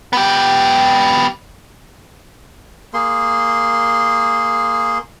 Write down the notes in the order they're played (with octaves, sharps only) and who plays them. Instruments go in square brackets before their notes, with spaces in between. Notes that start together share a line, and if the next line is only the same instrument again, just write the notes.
[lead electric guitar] B3 G4
[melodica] A#3 G#4 C6